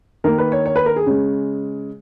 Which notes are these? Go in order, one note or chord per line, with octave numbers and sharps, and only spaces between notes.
D#3 A#3 A#4
B4
C#5
C#5
B4
A#4
G#4
C#3 G#3